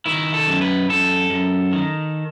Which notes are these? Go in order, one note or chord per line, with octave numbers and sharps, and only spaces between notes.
D#3 E4
A4
F#2
B4
F#2 A4
F#2
D#3